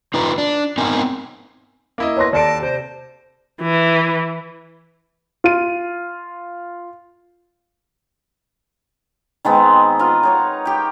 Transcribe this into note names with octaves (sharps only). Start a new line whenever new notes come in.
D#4 F4 B4 A#5
D4
B3 C4 D#4 A#4 G#5
A#3 E4 D#5
B4 C#5 C6 A#6
D#2 A4 D5 A5 D7
C3 C5
E3
F4 D#7
D#3 G#3 B3 C4
F4 A#4 B4 D#5
D#4 C#5 F#5
G4 G5